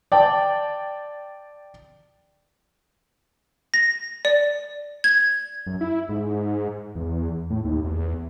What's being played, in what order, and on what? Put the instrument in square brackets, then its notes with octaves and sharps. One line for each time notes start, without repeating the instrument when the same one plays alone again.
[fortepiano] D5 G5 A5
[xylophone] A#6
D5
G#6
[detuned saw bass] F#2
E4
G#2
E2
A2
D#2
E2